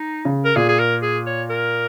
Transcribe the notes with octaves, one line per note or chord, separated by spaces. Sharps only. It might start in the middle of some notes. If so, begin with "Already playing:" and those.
Already playing: D#4
C#3
A#4
A#2 G#4
G#4
A#4
G#4
C#5
A#4